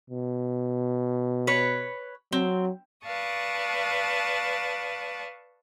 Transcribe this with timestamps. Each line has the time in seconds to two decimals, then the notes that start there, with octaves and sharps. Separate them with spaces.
0.10 B2
1.47 B4 C#5
2.32 F#3 C4
3.04 B4 D5 F5 A5 C#6 D#6